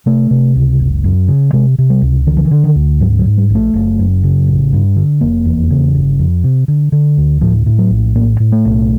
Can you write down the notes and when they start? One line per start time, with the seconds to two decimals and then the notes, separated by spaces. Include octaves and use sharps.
0.06 C3 A3
0.31 C3
0.56 C#2
0.79 F#1
1.04 F#2
1.28 C#3
1.53 C3 G#3
1.78 C3
1.90 G3
2.02 C#2
2.27 D3 D#3
2.37 F3
2.45 E3
2.51 D3
2.64 D#3
2.76 D2
3.00 G#2 F#3
3.19 F#3
3.25 G#2
3.38 G3
3.50 A#1
3.55 A3
3.73 F#1
3.99 F#2
4.24 C#3
4.47 A1
4.73 G2
4.96 D3
5.21 F1 A#3
5.45 E2
5.70 C#3
5.95 G1
6.19 F2
6.44 C3
6.68 D3
6.92 D3
7.17 D2
7.41 A2 F3
7.66 A2
7.78 F#3
7.90 A#1
8.15 A2 A#3
8.40 A2
8.52 A3
8.65 B1